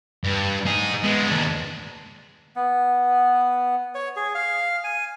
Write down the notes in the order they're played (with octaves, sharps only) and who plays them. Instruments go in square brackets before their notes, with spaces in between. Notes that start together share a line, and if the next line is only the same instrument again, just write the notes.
[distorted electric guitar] G2
D#4 G#4
G#3 B3
D#2 D4
[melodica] B3
C#5
G#4
F5
G#5